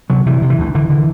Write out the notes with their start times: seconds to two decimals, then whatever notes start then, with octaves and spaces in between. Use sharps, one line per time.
0.10 C3 F#3
0.26 C3 E3
0.42 C3
0.50 E3
0.58 D2
0.75 D3 E3
0.90 D3